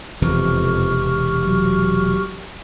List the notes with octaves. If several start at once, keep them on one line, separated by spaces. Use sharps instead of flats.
E1 F2 C3 E3 G4 C#6 F6
F#3